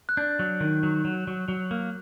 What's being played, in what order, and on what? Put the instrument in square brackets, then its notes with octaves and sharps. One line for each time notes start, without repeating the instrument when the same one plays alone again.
[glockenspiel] F#6
[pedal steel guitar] D4 [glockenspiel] G6
[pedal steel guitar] F#3
D#3
F#3
F#3
F#3
F#3
A#3